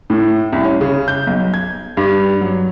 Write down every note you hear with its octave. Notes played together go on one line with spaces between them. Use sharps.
A2
C2
C#4
C#3
G6
B1
G#6
G2
F#3